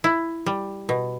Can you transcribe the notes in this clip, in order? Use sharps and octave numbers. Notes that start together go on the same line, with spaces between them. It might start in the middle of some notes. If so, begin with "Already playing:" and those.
E4
G3
B2